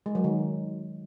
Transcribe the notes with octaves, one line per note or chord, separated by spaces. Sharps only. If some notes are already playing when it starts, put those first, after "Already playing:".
G#3
F#3
D#3